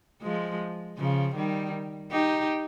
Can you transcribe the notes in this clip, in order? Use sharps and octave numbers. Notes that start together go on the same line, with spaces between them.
F3 G#3
C#3 F3
D#3 G3
D#4 G4